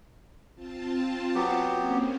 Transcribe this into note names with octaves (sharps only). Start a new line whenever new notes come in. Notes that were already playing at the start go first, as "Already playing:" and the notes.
C4 F4 A5
F#3 B3 G4
A#3 C4 C#4